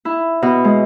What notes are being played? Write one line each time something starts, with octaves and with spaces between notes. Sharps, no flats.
E4
B2
G#3